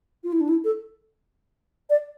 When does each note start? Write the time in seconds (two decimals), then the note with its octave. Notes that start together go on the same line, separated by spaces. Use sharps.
0.24 F4
0.32 E4
0.40 D4
0.49 E4
0.64 A4
1.90 D5